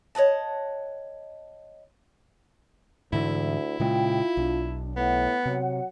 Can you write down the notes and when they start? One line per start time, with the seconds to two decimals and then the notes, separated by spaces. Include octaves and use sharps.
0.15 C#5 D#5 F#5 A5
3.13 D2 G#2 D3 E3 E4
3.80 A#2 C#3 G#3 F4 G5
4.37 B1 D4
4.96 A2 B3 F#5
5.46 C3 F#3